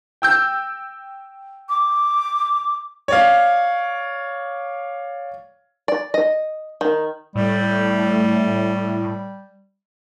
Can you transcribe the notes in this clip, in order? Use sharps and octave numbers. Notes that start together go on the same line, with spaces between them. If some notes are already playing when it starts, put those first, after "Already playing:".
G5 E6 G6
D6
C#5 D5 F5
D5
D#5
D#3
A2 G3